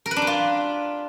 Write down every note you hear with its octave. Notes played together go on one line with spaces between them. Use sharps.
A#4
B4
D4
G4
F4